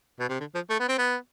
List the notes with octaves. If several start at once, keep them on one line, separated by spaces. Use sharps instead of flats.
B2
C3
D3
F3
A3
B3
C4
B3